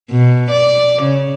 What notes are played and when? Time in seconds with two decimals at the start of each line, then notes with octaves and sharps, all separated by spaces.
0.11 B2
0.51 D5
1.03 C#3